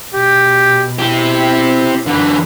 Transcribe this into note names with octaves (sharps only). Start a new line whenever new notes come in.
B2 G4
C4 E4 G4
F#2 D3 E3